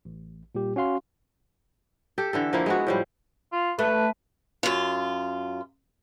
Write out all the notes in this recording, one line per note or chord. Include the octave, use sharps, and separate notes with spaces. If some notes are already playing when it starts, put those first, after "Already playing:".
A1
A#2 G3 G4
C#4 F#4 F5 C6
G4 A4
D3 E3 A4
F3 A#3 E4
G#3 B3 F#4
A2 F3 G3
F4
A3 B4
F#2 F4